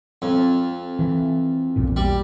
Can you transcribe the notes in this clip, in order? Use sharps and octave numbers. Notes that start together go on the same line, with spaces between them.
F2
E3
A#1 E2 A#2
G3